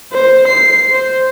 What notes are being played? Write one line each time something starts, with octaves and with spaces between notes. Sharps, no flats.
C5
C7
C5